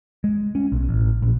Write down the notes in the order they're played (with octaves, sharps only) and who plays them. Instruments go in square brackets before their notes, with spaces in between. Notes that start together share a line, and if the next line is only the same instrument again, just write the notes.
[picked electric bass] G#3
C#4
B1
A1
A#1